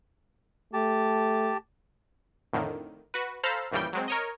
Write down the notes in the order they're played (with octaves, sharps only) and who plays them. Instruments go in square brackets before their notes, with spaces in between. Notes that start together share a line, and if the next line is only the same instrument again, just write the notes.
[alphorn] A3 [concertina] G4 A5
[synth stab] F2 A2 D3 D#3
F#4 B4
A4 C5 F5 A#5 B5 E6
A#1 F#2 C#3 E3 G3 G5
F#3 G#3 C4
A#4 C#5 D#5